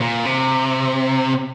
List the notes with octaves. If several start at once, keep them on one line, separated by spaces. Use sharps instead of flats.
A#2
C3